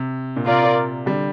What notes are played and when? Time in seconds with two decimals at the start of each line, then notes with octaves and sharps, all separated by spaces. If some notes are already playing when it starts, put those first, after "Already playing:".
Already playing: C3
0.36 A#2
0.46 C3 F4 A#4 D5
1.06 D3 G3